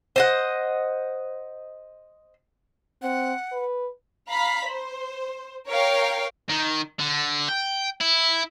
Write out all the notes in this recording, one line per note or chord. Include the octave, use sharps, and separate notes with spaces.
C5 D#5 F#5
C4 F#5
B4
F5 A#5 B5 B6
C5
A#4 C#5 F5 G5
D#3
D3
G5
E4